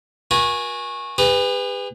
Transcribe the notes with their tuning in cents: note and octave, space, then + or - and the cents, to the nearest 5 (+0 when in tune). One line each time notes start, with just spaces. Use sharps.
F#4 -20 A#4 +45 G#5 +0
G#4 -45 B4 +15